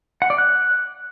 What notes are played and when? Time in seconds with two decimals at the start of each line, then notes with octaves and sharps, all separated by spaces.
0.22 F#5
0.30 D5
0.38 F#6